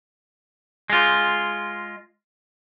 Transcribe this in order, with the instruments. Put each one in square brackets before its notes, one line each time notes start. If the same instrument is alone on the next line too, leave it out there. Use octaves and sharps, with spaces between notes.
[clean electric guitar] G#3 F4